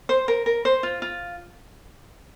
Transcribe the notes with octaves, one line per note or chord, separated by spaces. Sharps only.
C5
A#4
A#4
C5
F4
F4